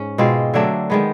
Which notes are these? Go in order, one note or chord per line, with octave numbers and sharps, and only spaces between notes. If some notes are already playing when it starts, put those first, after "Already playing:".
Already playing: G#2 C#4
B2 G#3 C4 F4
D3 F#3 A3 D4
D#3 G#3 B3